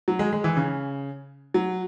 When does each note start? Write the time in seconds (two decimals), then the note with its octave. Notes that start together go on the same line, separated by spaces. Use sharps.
0.08 F#3
0.19 G#3
0.33 G#3
0.44 E3
0.57 C#3
1.54 F#3